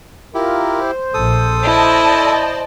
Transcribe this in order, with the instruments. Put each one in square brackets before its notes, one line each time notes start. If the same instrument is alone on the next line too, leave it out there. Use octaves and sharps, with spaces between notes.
[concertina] E4 G4 [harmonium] F4 A#4
[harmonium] C5
[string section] A#1 [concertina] A4 D#6
[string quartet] E4 [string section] D5 D#5 A5